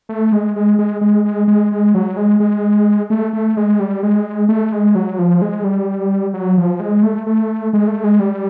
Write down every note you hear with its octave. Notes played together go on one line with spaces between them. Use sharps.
A3
G#3
G#3
G#3
G#3
G#3
G#3
G#3
F#3
G#3
G#3
A3
A3
G#3
G3
G#3
A3
G#3
F#3
F3
G#3
G3
F#3
F3
G#3
A3
A3
G#3
A3
G#3
G3